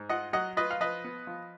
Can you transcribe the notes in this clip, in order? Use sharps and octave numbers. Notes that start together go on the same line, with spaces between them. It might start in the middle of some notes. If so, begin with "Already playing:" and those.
Already playing: G#2
F4 D#5 F#5
F#3 D#5 F#5
F4 B4 D#5
F5
F3 B4 D#5
B3
F3